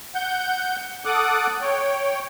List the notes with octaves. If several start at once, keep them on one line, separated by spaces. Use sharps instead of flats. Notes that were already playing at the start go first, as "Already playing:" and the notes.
F#5 G6
A4 F#5 D6 D#6 F#6
C#5 G5